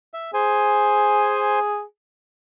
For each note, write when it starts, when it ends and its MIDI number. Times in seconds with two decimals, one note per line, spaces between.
0.14 0.31 76
0.34 1.82 68
0.34 1.59 72
0.34 1.59 80